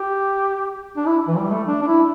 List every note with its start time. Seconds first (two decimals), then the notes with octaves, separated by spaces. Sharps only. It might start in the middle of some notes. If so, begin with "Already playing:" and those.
Already playing: G4
0.97 D4
1.06 E4
1.28 E3
1.37 G3
1.51 A3
1.67 D4
1.82 D4
1.87 E4